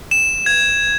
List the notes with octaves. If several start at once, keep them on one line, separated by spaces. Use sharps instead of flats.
E7
G#6